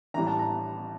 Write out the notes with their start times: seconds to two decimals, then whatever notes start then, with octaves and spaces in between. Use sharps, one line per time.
0.14 A1 A2 E3 G3 A#5
0.27 A5
0.39 A#5